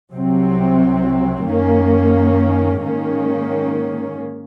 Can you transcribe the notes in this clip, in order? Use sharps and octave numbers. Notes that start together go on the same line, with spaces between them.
C2 C3 F#3 C4
F#2 D#3 A#3 C#4
G#2 D#3 A#3 C#4